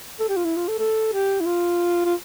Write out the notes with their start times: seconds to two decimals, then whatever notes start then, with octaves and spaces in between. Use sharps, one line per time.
0.20 A4
0.29 G4
0.37 F4
0.45 E4
0.57 F4
0.68 A4
0.78 A4
1.13 G4
1.41 E4
1.46 F4
2.05 F4